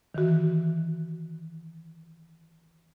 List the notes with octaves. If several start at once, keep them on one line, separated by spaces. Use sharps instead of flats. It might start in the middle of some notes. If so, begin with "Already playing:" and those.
D#3 E3 F#4